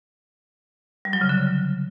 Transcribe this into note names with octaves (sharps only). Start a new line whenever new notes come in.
G3
F#3
C#3
D3